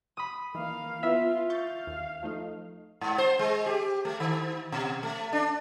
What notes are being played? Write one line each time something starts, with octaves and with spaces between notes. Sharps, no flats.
B5 D#6
D#3 E3 A#3 F5
B3 E4 F4 E5
F5 C#6 G6 A6
D#2
F3 A3 D#4
G#2
C5
G#3
G4
A3
D#3
B2
A3
D4